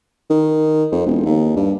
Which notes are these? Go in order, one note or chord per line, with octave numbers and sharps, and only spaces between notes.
D#3
F2
E1
D#2
G2